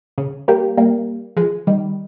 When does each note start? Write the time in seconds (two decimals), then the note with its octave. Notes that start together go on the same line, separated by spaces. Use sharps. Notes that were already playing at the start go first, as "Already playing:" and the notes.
0.18 C#3
0.48 G3 A#3
0.77 G3 A#3
1.36 F3 G#3
1.67 D#3 G3